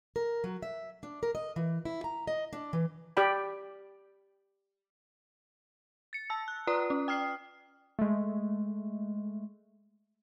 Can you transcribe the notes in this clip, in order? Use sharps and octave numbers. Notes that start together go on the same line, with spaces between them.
A#4
F#3
E5
D4
A#4
D#5
E3
E4
A#5
D#5
D4
E3
G4 D5 G5 B5
A6 C#7
A5 E6
F#6
F4 B4 D5 A#5 D#6
C#4
G5 D#6 F6 C7
G#3 A3